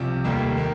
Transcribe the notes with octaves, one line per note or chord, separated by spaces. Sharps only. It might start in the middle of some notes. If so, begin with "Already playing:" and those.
Already playing: C2 C3 F3
F1 D#2 D#3 G3 A#3
D#3 A#3